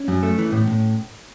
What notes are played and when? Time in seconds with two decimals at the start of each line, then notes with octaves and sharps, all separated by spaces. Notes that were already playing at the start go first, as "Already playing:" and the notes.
Already playing: C#4
0.08 F#2
0.23 A3
0.38 E3
0.52 A2
0.67 A2